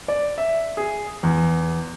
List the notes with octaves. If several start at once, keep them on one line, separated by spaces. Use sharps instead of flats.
D5
E5
G#4
E2